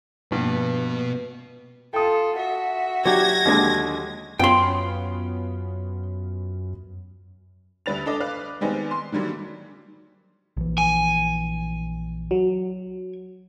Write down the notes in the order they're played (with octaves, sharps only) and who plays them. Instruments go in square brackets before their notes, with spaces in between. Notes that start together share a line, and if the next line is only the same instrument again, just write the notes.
[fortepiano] G2 [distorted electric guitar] B2 B3 [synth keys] F3 A#3 [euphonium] B4
[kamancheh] F4 A4 [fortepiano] G5 D#6
[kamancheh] F#4 E5
[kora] F#3 G4 [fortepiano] D4 [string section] G#6 A#6
[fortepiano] D#2 D3 G#3
[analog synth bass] F#2 [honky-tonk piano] B3 C#4 F4 [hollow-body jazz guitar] G5 C6
[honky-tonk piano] D2 G3 B4 A6 F7
D4 A4 D#5 D6
B4 F5 D6 F#6
D#3 G3 G#3 B3 C4 D#4
C6
D3 D#3 F#3 G3 A#3
[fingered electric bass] A#1 E3
[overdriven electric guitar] G#5
[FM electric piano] F#3